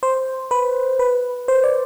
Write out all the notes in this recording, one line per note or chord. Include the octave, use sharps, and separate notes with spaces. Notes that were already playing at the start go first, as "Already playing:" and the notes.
C5
B4
B4
C5
D5